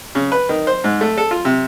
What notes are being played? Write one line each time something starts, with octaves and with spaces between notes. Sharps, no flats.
C#3
B4
D#3
C5
G#2
A3
A4
F4
C3